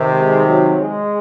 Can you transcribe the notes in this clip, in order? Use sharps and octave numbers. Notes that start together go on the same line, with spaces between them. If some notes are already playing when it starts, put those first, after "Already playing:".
Already playing: C3 D#3
G#3
F#3
G#3